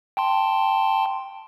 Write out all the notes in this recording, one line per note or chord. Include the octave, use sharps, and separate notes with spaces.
G5 A5 C6